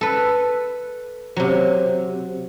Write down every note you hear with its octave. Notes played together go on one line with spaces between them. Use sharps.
A4 B4
C3 F#3